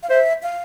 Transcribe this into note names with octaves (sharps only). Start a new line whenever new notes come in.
F5
C5 E5
F5